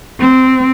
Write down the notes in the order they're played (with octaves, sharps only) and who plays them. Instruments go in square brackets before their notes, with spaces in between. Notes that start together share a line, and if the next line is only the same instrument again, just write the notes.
[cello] C4